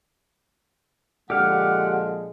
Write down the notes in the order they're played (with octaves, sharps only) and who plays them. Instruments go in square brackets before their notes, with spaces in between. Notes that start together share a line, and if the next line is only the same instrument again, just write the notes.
[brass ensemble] A#2 F3 G#3 [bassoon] D3 [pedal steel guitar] G4 F5 [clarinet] F#5